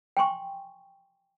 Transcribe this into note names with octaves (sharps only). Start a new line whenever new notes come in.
G5 G#5 C6 C#6